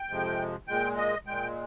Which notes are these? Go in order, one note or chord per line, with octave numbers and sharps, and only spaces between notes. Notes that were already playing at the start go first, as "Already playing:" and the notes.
Already playing: G5
F2 C3 F3 G#3
A#2 G#3 G5
D#5
A#2 G#3 G5